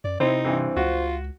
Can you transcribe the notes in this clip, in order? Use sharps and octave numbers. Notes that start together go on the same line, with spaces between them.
F#2 D5
C3 C4 D#4 E4 C5
G2 E3 C4
C#2 F4 F#4